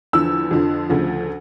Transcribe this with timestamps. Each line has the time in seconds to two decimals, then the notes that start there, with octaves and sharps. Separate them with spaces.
0.13 E2 D3 F3 E6
0.51 F2 D3 F3
0.89 D2 C#3 F3